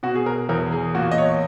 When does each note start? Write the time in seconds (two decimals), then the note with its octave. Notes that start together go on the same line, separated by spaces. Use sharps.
0.03 B2 F#4
0.15 G#4
0.26 A#4
0.49 E2 A#4
0.72 G#4
0.95 A#2 F#4
1.11 D#5
1.18 C#5